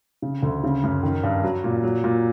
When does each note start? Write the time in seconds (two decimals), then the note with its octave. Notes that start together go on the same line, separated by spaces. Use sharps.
0.22 C#3
0.43 D2
0.64 C#3
0.83 F#2
1.03 D#3
1.23 G2
1.44 F#3
1.64 A#2
1.83 F#3
2.04 A#2